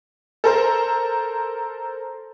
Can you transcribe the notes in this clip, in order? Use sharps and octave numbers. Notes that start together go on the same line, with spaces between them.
A4 A#4 C5